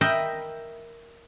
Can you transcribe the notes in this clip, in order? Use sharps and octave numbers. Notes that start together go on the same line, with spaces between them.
A#4 D#5 E5 G5 B5